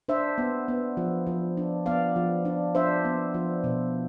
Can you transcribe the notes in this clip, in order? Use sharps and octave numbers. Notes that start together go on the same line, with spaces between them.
D4 C5 E5
B3
B3
F3
F3
D4
B3 D5 F5
F3
D4
D4 C5 E5
B3
F3
B2